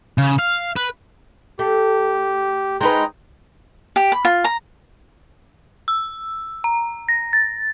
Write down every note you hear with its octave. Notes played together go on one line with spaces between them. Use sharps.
C#3
F5
B4
A3 G4
G#3 D#4 B4 G5 A#5
G4
B5
F4
A#5
E6
A#5
A#6
A6